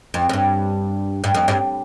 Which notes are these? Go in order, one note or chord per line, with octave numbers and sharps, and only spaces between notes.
F2
F2
G2
G2
F2
G2